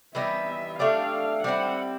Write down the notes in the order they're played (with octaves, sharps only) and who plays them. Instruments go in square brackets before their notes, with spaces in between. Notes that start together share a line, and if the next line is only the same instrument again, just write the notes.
[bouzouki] E3 G3 B3 D#4 [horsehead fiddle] E5
[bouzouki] A3 D4 G4 [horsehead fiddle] F5
[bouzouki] G3 C4 E4 [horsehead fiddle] F#5